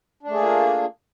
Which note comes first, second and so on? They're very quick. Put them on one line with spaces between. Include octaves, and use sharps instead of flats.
D4 A3 G#4 A#3 F4